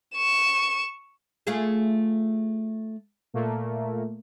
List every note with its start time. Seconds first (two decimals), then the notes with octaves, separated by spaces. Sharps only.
0.16 C#6 E7
1.47 A3 F4 G#4
3.34 A#2 A3 A#3